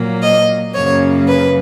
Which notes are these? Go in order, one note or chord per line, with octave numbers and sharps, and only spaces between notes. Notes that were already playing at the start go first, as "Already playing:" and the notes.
Already playing: A#2 F#3 A#3
D#5
F#2 C#3 F#3 A#3 C#5
B4